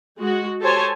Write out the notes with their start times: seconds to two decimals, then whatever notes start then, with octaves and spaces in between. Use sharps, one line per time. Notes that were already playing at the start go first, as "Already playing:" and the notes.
0.18 G#3 F#4
0.61 G4 A4 C5 C#5 G#5 A5